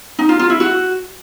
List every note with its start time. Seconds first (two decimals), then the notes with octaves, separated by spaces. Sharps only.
0.19 D#4
0.29 F4
0.39 F4
0.50 E4
0.60 F#4